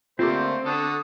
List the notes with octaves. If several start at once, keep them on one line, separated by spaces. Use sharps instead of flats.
D3 A3 A#3 C4 F4 G4 C5
D3 D4 F#4 A4 D#6